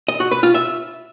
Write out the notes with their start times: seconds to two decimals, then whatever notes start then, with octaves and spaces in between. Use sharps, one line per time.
0.08 D#5
0.20 F#4
0.31 B4
0.43 F4
0.54 E5